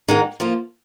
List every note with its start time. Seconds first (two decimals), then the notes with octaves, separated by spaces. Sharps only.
0.08 G#2 D#3 G#3 D#4
0.40 F3 A#3 F4